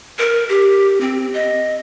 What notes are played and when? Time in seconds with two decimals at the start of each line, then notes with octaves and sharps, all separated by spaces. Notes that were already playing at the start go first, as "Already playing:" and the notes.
0.19 A#4
0.49 G4
1.01 C4
1.34 D#5